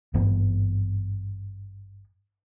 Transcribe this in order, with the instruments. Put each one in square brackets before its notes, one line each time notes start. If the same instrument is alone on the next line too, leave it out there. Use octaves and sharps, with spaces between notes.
[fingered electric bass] G#1 G2 E3 B3